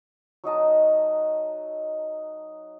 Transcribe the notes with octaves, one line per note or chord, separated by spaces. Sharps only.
F#3 D#4 D#5 A5